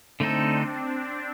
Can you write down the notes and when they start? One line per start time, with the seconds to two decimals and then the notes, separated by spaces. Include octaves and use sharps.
0.20 D3 A3 C4 D#4 A4
0.51 D4